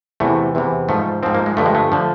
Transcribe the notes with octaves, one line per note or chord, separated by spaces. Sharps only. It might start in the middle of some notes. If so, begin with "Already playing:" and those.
E2 C3 E3 A3
E2 C3 E3
G#2 F3 A3
G#2 F3 C4
A#3
G#3
G2 D3 F3 A3
G#3
A3
D3 F3